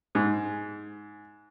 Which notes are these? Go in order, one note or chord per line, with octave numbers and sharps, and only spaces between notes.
G#2